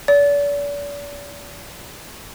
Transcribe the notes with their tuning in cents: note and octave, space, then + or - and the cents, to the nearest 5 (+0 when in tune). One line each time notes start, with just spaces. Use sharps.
D5 -40